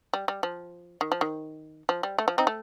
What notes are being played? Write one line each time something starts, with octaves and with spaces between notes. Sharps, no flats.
G3
G3
F3
D#3
F3
D#3
F3
G3
A3
F3
C4 D#4
A3